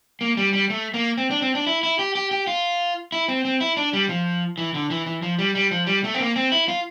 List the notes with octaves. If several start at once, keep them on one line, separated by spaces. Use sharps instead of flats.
A#3
G3
G3
A3
A#3
C4
D4
C4
D4
E4
E4
G4
G4
G4
F4
E4
C4
C4
E4
D4
G3
F3
E3
D3
E3
E3
F3
G3
G3
F3
G3
A3
C4
A#3
C4
E4
F4